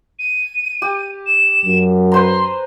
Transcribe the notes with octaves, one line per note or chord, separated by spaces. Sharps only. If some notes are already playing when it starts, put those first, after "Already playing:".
D#7
G4
E7
F#2
B4 C5 A#5 C6